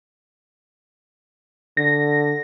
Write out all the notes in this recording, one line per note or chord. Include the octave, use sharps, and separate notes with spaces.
D3 A#6